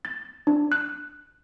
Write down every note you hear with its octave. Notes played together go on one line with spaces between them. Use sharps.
A6
D4
F#6